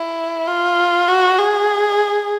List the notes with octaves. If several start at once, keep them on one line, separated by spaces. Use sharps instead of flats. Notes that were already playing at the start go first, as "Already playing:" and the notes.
Already playing: E4
F4
F#4
G#4